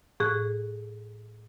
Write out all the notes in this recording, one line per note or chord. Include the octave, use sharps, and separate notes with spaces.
A2 G#4 F#6